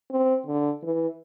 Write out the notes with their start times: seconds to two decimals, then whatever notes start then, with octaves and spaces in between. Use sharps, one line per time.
0.11 C4
0.46 D3
0.82 E3